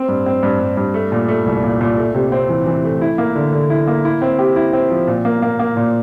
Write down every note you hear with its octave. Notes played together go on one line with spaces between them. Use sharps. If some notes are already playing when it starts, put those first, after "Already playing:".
Already playing: C4
G2
C4
G2
G2
G2
A3
A#2
A3
C2
A#2
A#2
A3
C3
C4
E3
E3
A3
E4
A#3
D3
D3
E4
A#3
E4
C4
G4
E4
C4
F3
A#2
A#3
A#3
A#3
A#2